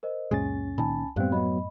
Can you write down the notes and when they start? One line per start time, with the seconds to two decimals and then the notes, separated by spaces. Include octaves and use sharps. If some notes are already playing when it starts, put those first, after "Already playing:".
0.03 A#4 C5 D#5
0.31 C#2 F#2 A#2 G#3 C#4 G#5 A6
0.78 A#2 D#3 G#5 A5 B5
1.16 F#2 A2 G3 B3 C4 G4 F5 F#6
1.32 F#3 B3 D#5 B5